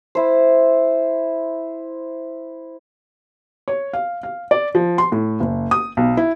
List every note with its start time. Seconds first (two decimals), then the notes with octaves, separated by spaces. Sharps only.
0.15 E4 C5
3.68 C#5
3.93 F5
4.23 F5
4.51 D5
4.75 F3
4.98 C6
5.12 A2
5.40 F#1
5.71 D#6
5.97 B1
6.17 E4